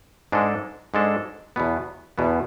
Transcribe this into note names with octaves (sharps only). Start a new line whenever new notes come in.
G#2 G#3 D4 A4
G#2 G#3 D4 A4
E2 B2 B3
E2 B2 B3